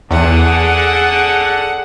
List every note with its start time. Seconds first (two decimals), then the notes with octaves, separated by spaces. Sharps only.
0.11 E2 D3 G#4 F#5